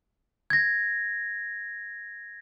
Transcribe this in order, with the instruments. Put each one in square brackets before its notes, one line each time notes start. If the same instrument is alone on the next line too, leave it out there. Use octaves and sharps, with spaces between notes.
[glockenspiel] G#6 A#6